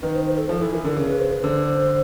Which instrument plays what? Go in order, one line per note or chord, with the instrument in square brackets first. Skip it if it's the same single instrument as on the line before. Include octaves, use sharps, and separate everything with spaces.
[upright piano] D#3 [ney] B4
[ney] C5
C5
A4
[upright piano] F3 [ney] A4
[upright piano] E3 [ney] A4
[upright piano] E3 [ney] A#4
[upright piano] D3 [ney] A#4
[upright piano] C#3 [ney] A#4
[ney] B4
C5
B4
[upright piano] D3 [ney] C5